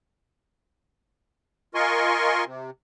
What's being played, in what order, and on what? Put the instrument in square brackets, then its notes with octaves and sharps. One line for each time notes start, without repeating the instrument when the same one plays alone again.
[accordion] F4 A#4 D#5 G#5 C6 C#6
C3